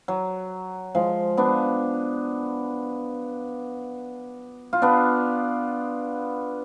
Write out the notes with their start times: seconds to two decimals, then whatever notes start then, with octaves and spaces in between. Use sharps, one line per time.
0.08 F#3
0.95 F3 G#3
1.37 B3 D4
4.73 F4
4.82 B3 D4